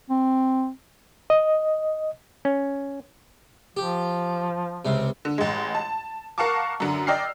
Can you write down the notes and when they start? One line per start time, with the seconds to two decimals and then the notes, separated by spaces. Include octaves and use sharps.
0.10 C4
1.30 D#5
2.45 C#4
3.77 F3 G4
4.85 C#2 C3
5.25 D3
5.38 A1 G#3
5.75 A5
6.38 A#4 F5 F#5 A5 C#6 D6
6.80 F#2 D3
7.07 D5 D#5 G5 E6 F6 C7